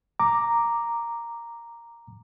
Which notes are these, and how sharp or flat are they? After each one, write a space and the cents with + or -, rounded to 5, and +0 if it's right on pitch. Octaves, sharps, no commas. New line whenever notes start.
A#5 +0 D6 +5